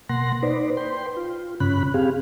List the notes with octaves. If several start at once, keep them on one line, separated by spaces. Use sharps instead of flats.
B2 A#3 F#5 C6 A#6
D#4 B4 C5 D5
B4 G5 C6
F4
G2 C#3 C#4 B5 F#6
C4 G4 G#4 F5